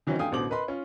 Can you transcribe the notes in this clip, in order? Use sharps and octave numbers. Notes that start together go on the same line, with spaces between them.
D#3 E3 F#3 C4 C#4 D#4
G2 A3 F5 G5 G#5 D#6
A1 B2 D3 C5 D6 F#7
A#4 B4 D#5 B5 C6
C#4 F4